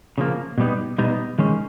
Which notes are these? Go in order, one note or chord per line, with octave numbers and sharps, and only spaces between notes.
C#3 F3 A#3
B2 G3 B3 D#4
B2 G3 B3 D#4
D#3 G#3 C#4